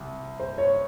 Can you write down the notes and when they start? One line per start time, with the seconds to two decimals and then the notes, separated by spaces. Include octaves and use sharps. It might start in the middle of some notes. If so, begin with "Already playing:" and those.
Already playing: C2
0.40 C5
0.58 C#5